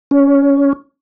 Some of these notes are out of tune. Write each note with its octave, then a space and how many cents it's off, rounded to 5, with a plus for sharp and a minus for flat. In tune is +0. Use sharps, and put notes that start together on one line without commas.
C#4 +15